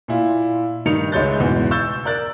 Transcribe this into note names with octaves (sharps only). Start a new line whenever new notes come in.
A#2 E4 F4
G2 D#3 D#4 C#7 F7
C#2 G#3 C#5 E5 G6 A6
E2 G#2 B2
C#6 E6 G6 A6
A#4 D5 F#6 A6